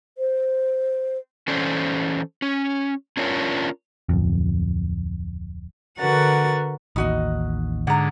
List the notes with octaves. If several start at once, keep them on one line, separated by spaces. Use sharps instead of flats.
C5
E3 C#4 A4 C5 D5
C#4
C#4 D4 F4 A#4 C#5
D1 F2
D3 F#4 A#4 B4 F#5 A6
A1 D#2 D#4 F#4 D#5
G#2 D3 F#5 A#5